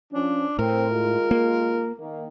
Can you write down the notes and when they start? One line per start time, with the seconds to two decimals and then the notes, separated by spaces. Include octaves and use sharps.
0.13 F3 C#4 D4
0.59 A2 C4 A#4
0.91 D#2 G#3 F4
1.31 A#3
1.99 D#3 A#3